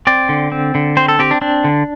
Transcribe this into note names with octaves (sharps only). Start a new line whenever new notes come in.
C4 D5
D3
C4
D3
C4 C5
A4
C4 G4
D4
C4 D4
D3